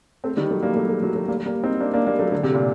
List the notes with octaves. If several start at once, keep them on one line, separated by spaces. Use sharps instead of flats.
A3 C4
D#3 G3
F#3 A3
G3 A#3
F#3 A3
F#3 A3
F#3 A3
F#3 A3
G3 A#3
G3 A#3
C4 D#4
A#3 D4
A#3 D4
G3 A#3
F#3 A3
D3
C3
A#2